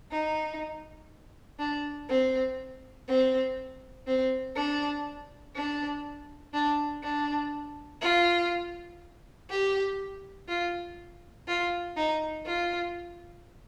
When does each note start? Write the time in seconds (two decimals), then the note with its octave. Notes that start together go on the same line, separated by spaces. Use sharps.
0.12 D#4
1.60 D4
2.09 C4
3.08 C4
4.07 C4
4.56 D4
5.56 D4
6.54 D4
7.03 D4
8.02 F4
9.50 G4
10.49 F4
11.48 F4
11.97 D#4
12.47 F4